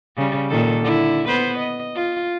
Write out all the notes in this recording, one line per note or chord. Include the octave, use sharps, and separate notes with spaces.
C#3 G3
A#2 D#3 A4
D3 E4
B3 B4 C5
D#5
F4